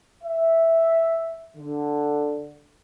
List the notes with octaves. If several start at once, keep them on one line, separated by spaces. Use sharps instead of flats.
E5
D3